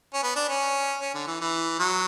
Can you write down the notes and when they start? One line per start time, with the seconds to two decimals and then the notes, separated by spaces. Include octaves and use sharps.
0.14 C#4
0.23 B3
0.36 D4
0.49 C#4
1.01 C#4
1.15 D3
1.27 E3
1.41 E3
1.80 F#3